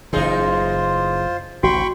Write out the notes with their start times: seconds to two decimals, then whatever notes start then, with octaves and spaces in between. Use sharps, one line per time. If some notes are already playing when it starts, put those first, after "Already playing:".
0.13 F#1 C#3 E3 D#4 F4 G#4 C5
1.63 A1 D2 C3 F#4 G5 B5 C#6